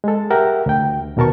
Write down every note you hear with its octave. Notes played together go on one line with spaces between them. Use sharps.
G#3 A4
G4 A#4 E5 F#5 G5
D2 G5
D#2 B2 A#4 A5 C#6